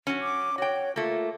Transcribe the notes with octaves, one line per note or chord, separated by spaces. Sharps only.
F#3 C#4
D6
F#4 C#5 G5
A3 A#3 F4